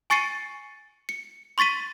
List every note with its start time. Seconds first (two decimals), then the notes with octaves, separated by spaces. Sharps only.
0.10 G#5 C#6 A6 C7 C#7 D#7
1.09 C#7
1.58 C6 C#6 A6 B6 D#7